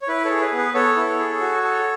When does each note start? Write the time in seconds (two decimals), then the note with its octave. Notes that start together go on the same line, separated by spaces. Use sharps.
0.02 C#5
0.08 E4 B4
0.25 A4 C#5
0.30 G#4
0.41 B4
0.52 B3
0.58 B4
0.74 B3 A4 C#5
0.97 E4
1.19 G#4
1.41 F#4
1.63 A4